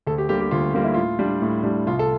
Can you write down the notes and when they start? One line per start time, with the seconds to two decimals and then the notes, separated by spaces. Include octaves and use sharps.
0.07 D2 A4
0.18 G4
0.29 D3 G3 A#3 G4
0.41 G4
0.51 D2 F4
0.74 D3 G3 A#3 F4
0.84 E4
0.94 A2 F4
1.19 G3 D4
1.42 A2
1.64 G3 D4
1.86 C2 F4
1.99 A4